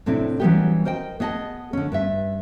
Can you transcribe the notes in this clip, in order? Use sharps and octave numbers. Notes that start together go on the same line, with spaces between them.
A2 C3 C4 D4 E4
E3 F#3 G3 B3 C#4 G4
A#4 C5 D#5 G5
B3 G#4 D#5 G#5 A5
D3 C#4
G2 B4 E5